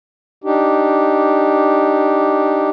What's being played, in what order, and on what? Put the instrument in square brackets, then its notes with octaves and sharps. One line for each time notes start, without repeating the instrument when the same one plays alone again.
[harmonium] D4 D#4 G4